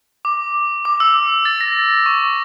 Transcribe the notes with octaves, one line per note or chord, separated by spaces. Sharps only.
D6
D6
E6
A6
A#6
C#6